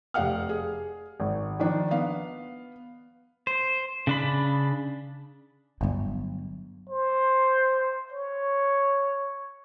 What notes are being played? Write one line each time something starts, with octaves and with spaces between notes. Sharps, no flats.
F1 G4 F5 F#5 F6
G#4
G#1
D#3 F3 D4
B3 F5
C5
C#3 D4 B5
G1 F#3 A3
C5
C#5